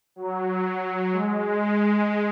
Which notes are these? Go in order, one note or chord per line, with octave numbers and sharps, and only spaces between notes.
F#3
F#3
G#3
G#3